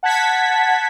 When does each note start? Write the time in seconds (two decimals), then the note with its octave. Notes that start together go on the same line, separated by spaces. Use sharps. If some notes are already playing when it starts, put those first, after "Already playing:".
0.03 F#5 A5 G#6 B6